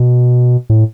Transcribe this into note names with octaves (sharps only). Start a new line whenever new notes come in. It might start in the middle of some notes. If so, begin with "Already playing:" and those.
Already playing: B2
A2